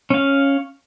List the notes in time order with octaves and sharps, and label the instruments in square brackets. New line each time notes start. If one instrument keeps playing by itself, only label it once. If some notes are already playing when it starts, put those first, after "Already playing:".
[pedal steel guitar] C#4 F5